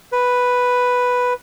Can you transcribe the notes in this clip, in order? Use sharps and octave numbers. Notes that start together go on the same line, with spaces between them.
B4